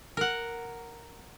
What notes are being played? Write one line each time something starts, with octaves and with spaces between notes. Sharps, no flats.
A#4 F#5